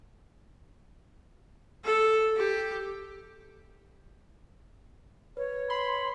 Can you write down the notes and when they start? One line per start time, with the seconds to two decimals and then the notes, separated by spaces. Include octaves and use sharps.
1.84 A4
2.36 G4
5.37 B4 C#5
5.70 B5 C6